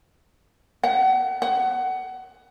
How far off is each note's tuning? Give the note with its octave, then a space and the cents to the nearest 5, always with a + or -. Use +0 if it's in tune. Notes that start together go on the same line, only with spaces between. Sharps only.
F#5 +30
F#5 +20